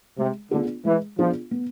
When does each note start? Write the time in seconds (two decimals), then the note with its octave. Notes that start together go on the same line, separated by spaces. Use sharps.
0.18 C3 G#3
0.51 D3 B3 D4 F4 G#4
0.85 E3 G#3
1.18 F3 B3 D4 F4 G#4
1.51 B3